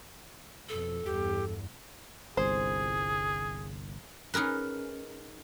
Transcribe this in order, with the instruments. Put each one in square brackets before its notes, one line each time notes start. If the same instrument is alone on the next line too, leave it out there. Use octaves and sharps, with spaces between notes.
[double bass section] F2 B2 [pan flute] A4
[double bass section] E2 G2 [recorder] G4
[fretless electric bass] G1 C2 [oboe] G#4 [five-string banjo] C5
[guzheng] C#4 D#4 G#4 A#4 B4